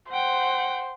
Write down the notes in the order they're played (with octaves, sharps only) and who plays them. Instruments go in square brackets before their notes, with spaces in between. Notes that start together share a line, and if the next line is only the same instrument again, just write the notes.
[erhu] C5 [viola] F#5 G5